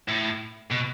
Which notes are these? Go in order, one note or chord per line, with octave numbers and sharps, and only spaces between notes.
A2
B2